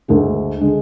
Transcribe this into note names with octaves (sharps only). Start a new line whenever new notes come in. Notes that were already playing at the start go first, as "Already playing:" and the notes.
D2 D3 G#3
D3 G#3